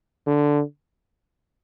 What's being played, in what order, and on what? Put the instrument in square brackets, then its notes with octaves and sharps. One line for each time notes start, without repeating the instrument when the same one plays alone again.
[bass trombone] D3